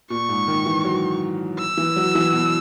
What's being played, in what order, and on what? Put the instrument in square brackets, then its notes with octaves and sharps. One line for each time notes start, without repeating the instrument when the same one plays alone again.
[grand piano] A#2 [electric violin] C#6
[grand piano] G#2
D#3
E3
F#3
[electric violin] E6
[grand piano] E3
F#3
E3
B2